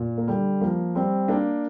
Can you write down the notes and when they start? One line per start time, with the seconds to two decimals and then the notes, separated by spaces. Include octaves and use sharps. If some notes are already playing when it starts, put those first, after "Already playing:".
Already playing: A#2
0.17 A#3
0.27 D3 G3
0.61 F3 A#3
0.95 G3 C4
1.28 A#3 D4